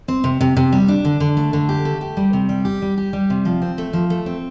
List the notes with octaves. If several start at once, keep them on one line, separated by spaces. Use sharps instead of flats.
C4
C3
C3
C3
G3
D4
D3
D3
A3
D3
G4
A3
G4
G3
C3
G3
G4
G3
G4
G3
C3
F3
C4
A3
F3
A3
C4